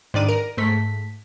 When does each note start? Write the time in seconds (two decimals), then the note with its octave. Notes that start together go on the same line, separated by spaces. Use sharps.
0.14 G#2 D#3 D4 D5 D#7
0.28 A#4
0.57 G#2 A3 B6